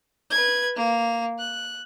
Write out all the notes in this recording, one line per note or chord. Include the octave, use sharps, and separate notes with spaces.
B4 G#6
A#3 F7
F#6